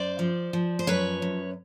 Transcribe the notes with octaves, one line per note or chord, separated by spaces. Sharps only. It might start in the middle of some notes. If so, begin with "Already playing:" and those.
Already playing: F#2 C5 D5
F3
F3
C5
F#2 B4 C#5
F#2